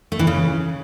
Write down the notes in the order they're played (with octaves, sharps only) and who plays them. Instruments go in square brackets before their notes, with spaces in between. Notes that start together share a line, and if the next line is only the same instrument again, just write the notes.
[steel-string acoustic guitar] A3
E3
C#3